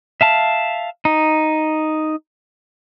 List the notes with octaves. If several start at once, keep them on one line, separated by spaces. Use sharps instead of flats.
E5 F5 A5
D#4